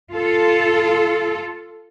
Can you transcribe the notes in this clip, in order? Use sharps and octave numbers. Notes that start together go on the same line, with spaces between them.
F4 A4